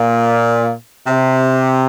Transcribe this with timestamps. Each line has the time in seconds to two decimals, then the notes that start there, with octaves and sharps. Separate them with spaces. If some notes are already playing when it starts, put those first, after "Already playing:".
Already playing: A#2
1.07 C3